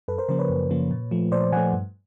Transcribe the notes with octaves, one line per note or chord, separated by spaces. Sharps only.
F#2 A4 B4
A#4 C5
C#3 F3 A#3 A#4 C5
B4 C#5
F#2
C#3 F3 A#3
A#2
F3 A3
A#2 C5 D5
F3 A3 F#5 G#5
G2